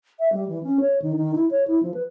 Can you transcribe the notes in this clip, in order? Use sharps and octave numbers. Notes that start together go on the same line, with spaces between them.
E5
G3
E3
C#4
C#5
D#3
D#3
E4
C#5
E4
F3
B4